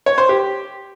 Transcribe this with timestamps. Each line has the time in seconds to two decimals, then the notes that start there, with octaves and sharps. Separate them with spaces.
0.06 C#5
0.18 C5
0.29 G4